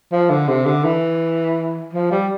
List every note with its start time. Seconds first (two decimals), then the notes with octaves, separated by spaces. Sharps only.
0.12 F3
0.30 D3
0.48 C3
0.66 D3
0.84 E3
1.93 F3
2.11 G3